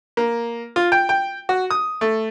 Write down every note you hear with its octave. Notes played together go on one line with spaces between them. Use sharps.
A#3
F4
G5
G5
F#4
D#6
A3